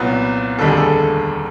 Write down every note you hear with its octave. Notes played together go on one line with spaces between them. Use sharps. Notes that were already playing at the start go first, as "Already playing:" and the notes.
Already playing: C2 A#2 F#3 B3
F1 D#2 D3 G3 A4
G#4
A4